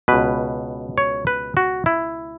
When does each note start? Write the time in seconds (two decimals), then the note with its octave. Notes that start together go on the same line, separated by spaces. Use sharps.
0.08 C#2 B2 B4
0.98 C#5
1.27 B4
1.57 F#4
1.86 E4